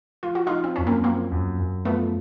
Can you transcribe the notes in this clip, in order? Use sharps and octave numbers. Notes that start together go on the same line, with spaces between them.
F3 F4
F#4
F3 D#4 F4
C4
F#2 C#4
A#3 C4
F3 A#3 C4
F#2
F#2
F3 A3 B3